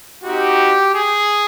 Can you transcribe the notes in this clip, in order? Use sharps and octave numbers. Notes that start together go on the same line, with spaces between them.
C4 D#4 F#4 G4
G#4